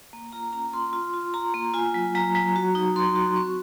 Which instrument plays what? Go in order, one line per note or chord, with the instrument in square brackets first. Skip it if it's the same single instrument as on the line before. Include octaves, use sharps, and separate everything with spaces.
[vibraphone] A#3
F4 A#5
C#4 A#5
F4 C6
F4
F4
F4 A#5
A#3
F4 G#5
F#3
F#3 A#5
F#3
F#4
D#4
F#4 C6
F#4
C4 C#6